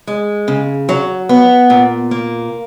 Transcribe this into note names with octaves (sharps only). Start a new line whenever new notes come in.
G#3
C#3
F#3
B3
A#2
A#3